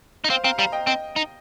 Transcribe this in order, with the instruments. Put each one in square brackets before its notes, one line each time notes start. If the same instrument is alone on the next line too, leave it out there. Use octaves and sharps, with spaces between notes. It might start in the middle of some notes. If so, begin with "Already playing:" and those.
[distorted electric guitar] D#4
[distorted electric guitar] C4 [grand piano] C5 F5
[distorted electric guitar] C4 [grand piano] F5 A#5
[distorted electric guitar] G3 [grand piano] F5 A#5
[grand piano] D#5 G5
[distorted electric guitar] C4 [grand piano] D#5 G5
[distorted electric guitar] D#4